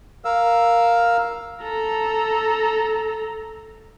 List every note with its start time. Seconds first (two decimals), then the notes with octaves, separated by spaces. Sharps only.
0.25 A#4 F5 E6
1.62 A4 A#5